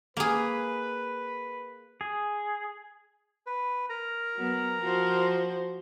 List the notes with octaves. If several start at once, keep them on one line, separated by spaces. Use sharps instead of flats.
A#3 G#4 B4
G#4
B4
A#4 A#5
F#3 B3
F3 F#4 C5